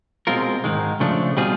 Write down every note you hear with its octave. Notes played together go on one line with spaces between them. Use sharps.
B2 G#3 C4 F4 A#4
G#2 D#3 G#3
C#3 F3 A3 D4
B2 G3 C4 F4 G#4